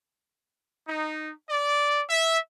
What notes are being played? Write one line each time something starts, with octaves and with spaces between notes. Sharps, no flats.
D#4
D5
E5